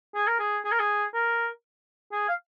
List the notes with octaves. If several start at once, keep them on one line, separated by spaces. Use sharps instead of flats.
G#4
A#4
G#4
G#4
A#4
G#4
A#4
G#4
F5